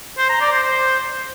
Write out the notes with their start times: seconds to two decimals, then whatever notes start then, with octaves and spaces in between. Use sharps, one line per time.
0.18 C5
0.29 A#5
0.41 D5
0.52 C5
0.63 C5